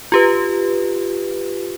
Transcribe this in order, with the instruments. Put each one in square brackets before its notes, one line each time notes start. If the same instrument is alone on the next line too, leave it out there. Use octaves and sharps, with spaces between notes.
[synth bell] F4 G4 B4